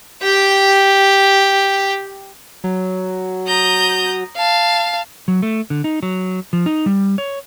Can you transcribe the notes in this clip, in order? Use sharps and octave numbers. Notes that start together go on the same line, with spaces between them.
G4 G5
F#3
A#5 D#6 G6
F5 A5
F#3
A3
D3
D#4
F#3
F3
D#4
G3
C#5